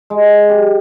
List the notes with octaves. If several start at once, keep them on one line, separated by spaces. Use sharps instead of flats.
G#3
G4